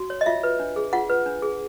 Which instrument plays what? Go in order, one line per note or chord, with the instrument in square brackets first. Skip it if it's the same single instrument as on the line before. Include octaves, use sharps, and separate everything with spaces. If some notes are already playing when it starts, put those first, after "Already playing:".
Already playing: [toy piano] F#4
C#5
D#5
F4 E5
B4
D4
G#4
F4 F#5
B4
D4
G#4